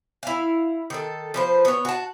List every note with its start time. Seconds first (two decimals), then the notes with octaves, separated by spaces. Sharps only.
0.23 E4 F5
0.90 D#3 A4
1.34 F3 B4 C5
1.65 B3 C#5
1.85 F#4 A5